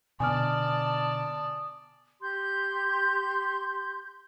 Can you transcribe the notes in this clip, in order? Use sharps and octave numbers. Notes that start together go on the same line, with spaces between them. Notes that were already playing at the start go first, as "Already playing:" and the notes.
B2 D3 B3 D5 G#5 A5 D#6 F6
G4 C6 G6